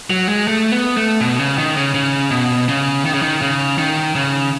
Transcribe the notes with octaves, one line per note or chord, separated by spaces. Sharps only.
F#3
G#3
A3
B3
A3
B2
C#3
D#3
C#3
C#3
B2
C#3
D#3
C#3
D#3
C#3
D#3
C#3